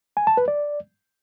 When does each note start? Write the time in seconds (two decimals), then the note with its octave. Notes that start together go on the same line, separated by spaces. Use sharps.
0.17 G#5
0.27 A5
0.37 B4
0.48 D5